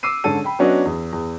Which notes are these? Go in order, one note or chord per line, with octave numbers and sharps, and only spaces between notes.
D6 E6 C7 D#7
G#2 D3 C#4 A4 D#7
G5 B5
F#3 B3 C#4 D4 F#4 D#5
E2
E2